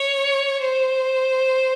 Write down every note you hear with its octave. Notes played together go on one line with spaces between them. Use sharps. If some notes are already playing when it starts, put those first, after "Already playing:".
Already playing: C#5
C5